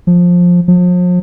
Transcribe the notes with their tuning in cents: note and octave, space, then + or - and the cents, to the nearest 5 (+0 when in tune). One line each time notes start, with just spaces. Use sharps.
F3 +15
F3 +40